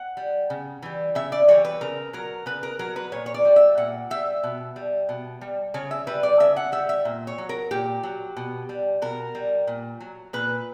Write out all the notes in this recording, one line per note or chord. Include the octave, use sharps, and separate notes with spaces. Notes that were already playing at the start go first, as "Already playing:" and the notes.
Already playing: F#5
G3
C#3
E3 G3
C#3 E5
D5
E3 G3 C#5
B4
C#3 A#4
F#3 A#4
C#3 B4
A#4
F#3 A#4
B4
A#2 C#5
C#5
D5
G3
E5
A#2 F#5
G3 E5
B2
G3
B2
G3
C#3 C#5
E5
G3 B4
D5
C#3 E5
F#5
G3 E5
E5
A#2
C#5
F#3
A#4
A#2 G4
F#3
B2
G3
B2 A#4
G3
A#2
F#3
A#2 B4